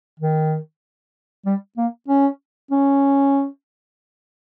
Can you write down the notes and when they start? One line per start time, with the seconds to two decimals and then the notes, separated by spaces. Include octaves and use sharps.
0.20 D#3
1.46 G3
1.77 A#3
2.08 C#4
2.71 C#4